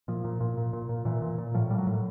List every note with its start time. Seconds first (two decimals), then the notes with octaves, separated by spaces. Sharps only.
0.08 A#2 F3
0.25 A#2
0.40 A#2
0.57 A#2
0.73 A#2
0.89 A#2
1.05 A#2 E3
1.22 A#2
1.38 A#2
1.54 A2 F3
1.70 A2 G3
1.78 F#3
1.87 A2